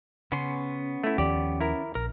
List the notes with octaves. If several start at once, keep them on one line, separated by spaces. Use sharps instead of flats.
C#3 B3 C#4 C6
A3 E4
D#2 D#3 F3 G4 D5
E4 A#4
A#1 A#4